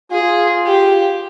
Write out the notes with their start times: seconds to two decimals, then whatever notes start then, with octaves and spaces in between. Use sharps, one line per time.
0.11 F4 G#4
0.66 G4